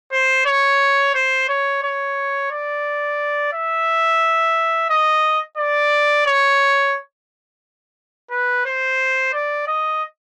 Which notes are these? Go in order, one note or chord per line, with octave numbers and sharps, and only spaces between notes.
C5
C#5
C5
C#5
C#5
D5
E5
D#5
D5
C#5
B4
C5
D5
D#5